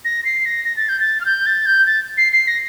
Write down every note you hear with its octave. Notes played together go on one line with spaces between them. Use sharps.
A#6
C7
A#6
A#6
A6
G6
A6
F6
G6
A6
G6
A6
C7
C7
A#6